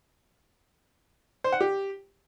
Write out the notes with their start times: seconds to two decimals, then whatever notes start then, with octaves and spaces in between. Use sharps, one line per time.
1.44 C5
1.53 F#5
1.61 G4